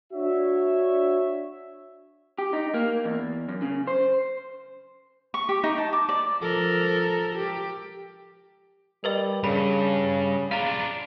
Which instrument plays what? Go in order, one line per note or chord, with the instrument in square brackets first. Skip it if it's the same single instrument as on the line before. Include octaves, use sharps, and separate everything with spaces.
[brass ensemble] D4 F#4 C#5 E5
[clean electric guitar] G4
D#4
A#3
E2
F#2
C#3
C5
[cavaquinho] C#6
G4
D#4
A5
D6
D5
[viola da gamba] F3 A4 A#4
G4
[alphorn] G3 [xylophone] A#4 B4 D#5
[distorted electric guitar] G2 [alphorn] C#3 [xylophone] B5
[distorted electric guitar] D4 F4 [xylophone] F5 A#5